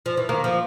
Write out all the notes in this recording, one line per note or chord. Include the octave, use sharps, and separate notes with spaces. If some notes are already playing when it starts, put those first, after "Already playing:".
F3
E3
D#3 A#3
F3